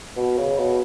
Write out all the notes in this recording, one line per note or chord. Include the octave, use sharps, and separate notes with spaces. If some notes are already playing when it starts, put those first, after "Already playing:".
B2
C#3
B2